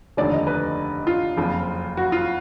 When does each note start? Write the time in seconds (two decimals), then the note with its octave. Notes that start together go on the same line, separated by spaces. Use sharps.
0.17 F1 D#2 D3 F3 D5
0.32 D#5
0.47 B4
1.07 F4
1.37 F#1 F2 F3
1.97 F#4
2.12 F4